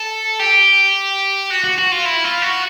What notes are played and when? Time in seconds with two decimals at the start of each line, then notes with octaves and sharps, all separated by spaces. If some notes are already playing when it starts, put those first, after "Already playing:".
Already playing: A4
0.40 G4
1.50 F#4
1.64 F#4
1.78 F#4
1.92 F4
2.05 E4
2.24 F4
2.42 F#4